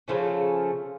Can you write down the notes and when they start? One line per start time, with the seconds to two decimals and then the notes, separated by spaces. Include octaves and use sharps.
0.08 C#3 F3 A3 C#4